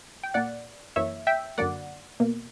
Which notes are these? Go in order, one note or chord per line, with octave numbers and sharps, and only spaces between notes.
G5
A#2 A#3 D5 F#5
F#2 E3 A#3 C#5 E5
E5 G5
F#2 D3 F#3 A#3 D5 F#5
B2 A#3